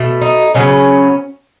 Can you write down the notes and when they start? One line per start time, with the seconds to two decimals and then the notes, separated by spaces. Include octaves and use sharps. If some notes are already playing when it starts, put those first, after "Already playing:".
Already playing: B2 A3
0.21 D#4
0.54 C#3 F#3 B3 C#4